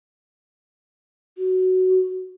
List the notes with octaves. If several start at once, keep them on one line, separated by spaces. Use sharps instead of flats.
F#4